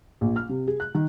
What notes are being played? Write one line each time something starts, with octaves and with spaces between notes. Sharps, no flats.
A#1
F6
C3
G#4
F#6
D#3